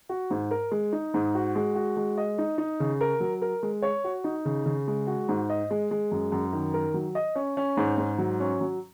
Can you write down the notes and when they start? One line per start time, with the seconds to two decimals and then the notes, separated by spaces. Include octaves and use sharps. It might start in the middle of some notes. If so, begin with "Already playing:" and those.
0.09 F#4
0.30 G#2
0.51 A#4
0.71 G#3
0.92 D#4
1.14 G#2
1.35 F#4
1.55 G#3
1.75 F#4
1.97 G#3
2.17 D#5
2.38 D#4
2.58 D#4
2.80 C#3
3.01 A#4
3.20 F#3
3.42 A#4
3.63 G#3
3.82 C#5
4.04 F#4
4.24 D#4
4.45 C#3
4.66 C#3
4.87 G#3
5.07 F#4
5.29 G#2
5.50 D#5
5.70 G#3
5.91 G#3
6.11 F#2
6.32 F#2
6.52 D#3
6.74 A#4
6.94 F#3
7.15 D#5
7.35 C#4
7.57 C#4
7.77 G#2
7.97 G#2
8.18 F#3
8.40 C#4
8.60 F#3